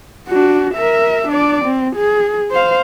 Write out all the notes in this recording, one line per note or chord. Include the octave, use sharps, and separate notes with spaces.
D4 F#4
A#4 E5
D4 D5
C4
G#4
C5 F5